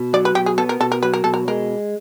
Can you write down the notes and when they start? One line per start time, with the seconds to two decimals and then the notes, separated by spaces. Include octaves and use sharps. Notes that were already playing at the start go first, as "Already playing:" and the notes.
Already playing: B2
0.13 F#3 D5
0.25 B4
0.35 B2 G4
0.46 G#4
0.58 B3 A4
0.69 A#4
0.80 B2 A4
0.92 A#4
1.02 F#3 B4
1.14 A#4
1.24 B2 A4
1.34 A#4
1.48 G#3 A#4